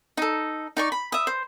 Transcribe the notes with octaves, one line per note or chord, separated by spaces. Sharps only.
D#4 A4
D#4 D5 C#6
B5
E5 D#6
C5